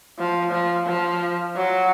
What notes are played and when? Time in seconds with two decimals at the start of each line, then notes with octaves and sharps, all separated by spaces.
0.19 F3
0.52 F3
0.86 F3
1.56 F#3